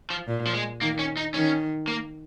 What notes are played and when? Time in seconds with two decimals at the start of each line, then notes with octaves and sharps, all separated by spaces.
0.10 F3
0.27 A#2
0.47 F3
0.54 G#3
0.81 D#3 A#3
0.99 C#4
1.17 D#4
1.34 D#3 C#4
1.88 A#3